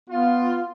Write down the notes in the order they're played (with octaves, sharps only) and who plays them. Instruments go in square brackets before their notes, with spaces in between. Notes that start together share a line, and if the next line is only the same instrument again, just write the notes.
[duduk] B3 [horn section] F4